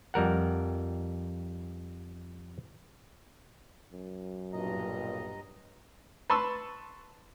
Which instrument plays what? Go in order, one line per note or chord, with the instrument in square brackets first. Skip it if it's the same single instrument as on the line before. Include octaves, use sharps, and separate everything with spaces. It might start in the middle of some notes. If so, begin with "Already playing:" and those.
[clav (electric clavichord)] F2 G3 A#4 F#5
[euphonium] F#2
[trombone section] B1 A#2 [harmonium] G2 D#5 A#5
[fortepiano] B4 A5 C6 C#6 E6